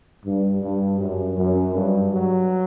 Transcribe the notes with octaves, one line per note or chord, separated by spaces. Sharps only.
G2
G2
F#2
F#2
G2
F#3